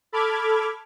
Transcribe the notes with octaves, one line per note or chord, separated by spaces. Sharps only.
A4 B5 D6 F6 G#6